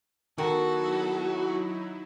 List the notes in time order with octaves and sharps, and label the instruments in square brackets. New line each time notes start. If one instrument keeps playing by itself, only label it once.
[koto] D#3 [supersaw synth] F#3 D#4 E4 [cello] B3 A4 [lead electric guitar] F#4